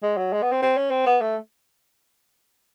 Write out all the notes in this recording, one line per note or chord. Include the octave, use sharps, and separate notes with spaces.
G#3
F#3
G#3
B3
C4
C4
C#4
C4
B3
A3